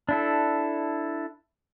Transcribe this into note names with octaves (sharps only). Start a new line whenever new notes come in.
D4 E4 A4